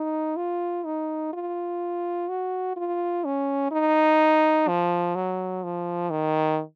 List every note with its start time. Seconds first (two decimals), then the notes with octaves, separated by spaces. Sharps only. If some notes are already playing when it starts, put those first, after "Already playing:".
Already playing: D#4
0.37 F4
0.85 D#4
1.33 F4
2.29 F#4
2.77 F4
3.25 C#4
3.71 D#4
4.68 F3
5.16 F#3
5.64 F3
6.10 D#3